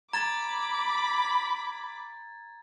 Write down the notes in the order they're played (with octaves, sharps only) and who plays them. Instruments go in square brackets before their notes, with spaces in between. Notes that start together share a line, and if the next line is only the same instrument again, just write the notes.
[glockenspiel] A#5 [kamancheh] B5 D6 [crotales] G#6 A6